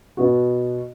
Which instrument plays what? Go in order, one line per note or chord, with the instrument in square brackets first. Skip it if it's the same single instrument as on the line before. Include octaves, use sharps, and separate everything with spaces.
[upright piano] B2 B3 F#4